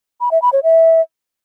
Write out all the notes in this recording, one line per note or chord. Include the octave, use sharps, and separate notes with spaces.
B5
E5
B5
C#5
E5